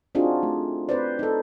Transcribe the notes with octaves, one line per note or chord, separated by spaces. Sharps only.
C4 D4 D#4 F4 F#4 G#4
A3
C4 B4 C5 D5
D#4 A4